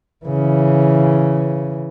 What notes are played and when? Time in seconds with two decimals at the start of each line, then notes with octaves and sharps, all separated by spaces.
0.25 C#3 E3